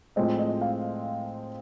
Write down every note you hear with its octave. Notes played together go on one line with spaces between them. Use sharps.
A2 F3 G#3 C4 D#5
D#5
F5